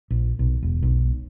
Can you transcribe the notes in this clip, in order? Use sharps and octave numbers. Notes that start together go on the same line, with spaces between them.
A#1
B1
E1
B1